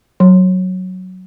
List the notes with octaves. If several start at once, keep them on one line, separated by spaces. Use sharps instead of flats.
F#3